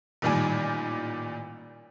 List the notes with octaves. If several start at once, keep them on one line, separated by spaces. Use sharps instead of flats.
A1 A#2 D#3 G3 D5 G#5